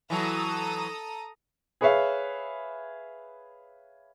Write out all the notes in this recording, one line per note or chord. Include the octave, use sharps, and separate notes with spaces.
E3 F#3 A4 A#5 D#6
G#4 B4 C#5 E5 F5